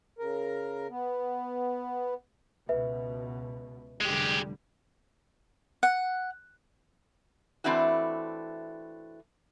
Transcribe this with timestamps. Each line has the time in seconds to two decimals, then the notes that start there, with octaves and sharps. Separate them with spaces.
0.19 C#3 A#4
0.89 B3
2.69 C#2 B2 B4 E5
4.01 F1 D3 G3 G#3 G4
5.83 F#5
7.64 E3 A3 C4 D4 E4 F#4